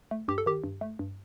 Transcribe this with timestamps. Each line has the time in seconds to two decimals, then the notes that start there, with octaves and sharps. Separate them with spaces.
0.11 A3
0.28 G2 G4
0.38 A4
0.46 D#3 G4
0.64 G2
0.81 A3
0.99 G2